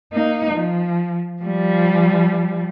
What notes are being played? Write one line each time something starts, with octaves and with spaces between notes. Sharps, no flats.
A#3 D#4
F3
F3 G3